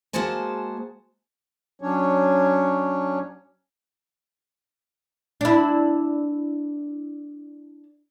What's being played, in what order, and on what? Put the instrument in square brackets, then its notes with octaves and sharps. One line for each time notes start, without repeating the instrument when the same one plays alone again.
[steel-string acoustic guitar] G#3 A#3 F#4 G#4 C5 A5
[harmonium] F#3 C#4 D4 C#5
[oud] D4 E4